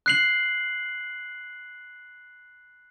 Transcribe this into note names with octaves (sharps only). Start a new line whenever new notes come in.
F#6 C7 F#7